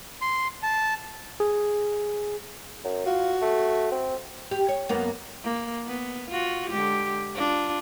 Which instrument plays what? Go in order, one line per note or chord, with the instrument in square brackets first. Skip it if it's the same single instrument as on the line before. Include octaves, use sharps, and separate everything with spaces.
[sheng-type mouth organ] C6
A5
[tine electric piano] G#4
[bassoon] F#2
[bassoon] F4 [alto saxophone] F#4
[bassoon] A3
C4
[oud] G4
C#5
F#2 A#3 B3
[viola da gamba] A#3
B3
F4 F#4
D3 G#3 G4
D4 F4